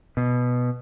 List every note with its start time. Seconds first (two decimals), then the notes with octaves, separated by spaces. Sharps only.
0.17 B2